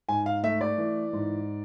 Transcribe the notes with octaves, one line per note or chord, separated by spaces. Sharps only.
G#2 G#5
F5
A3 E5
D5
E3
G#2